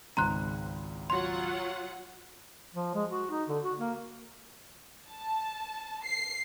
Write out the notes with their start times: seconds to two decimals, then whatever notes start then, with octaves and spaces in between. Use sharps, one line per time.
0.17 G#1 C#2 G#2 A#5 C6 F#6
1.10 F#3 F4 F#5 C6
2.74 F3
2.95 G#3
3.10 F#4
3.30 D#4
3.48 D3
3.64 F#4
3.78 A#3
5.10 A5
6.04 C7